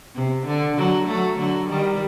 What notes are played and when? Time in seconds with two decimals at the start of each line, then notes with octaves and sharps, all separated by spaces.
0.15 C3
0.46 D3
0.77 D3 F#3
1.07 F#3 A3
1.39 D3 F#3
1.69 D#3 G3